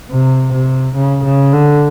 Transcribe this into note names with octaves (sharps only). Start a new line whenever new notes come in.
C3
C3
C#3
C#3
D3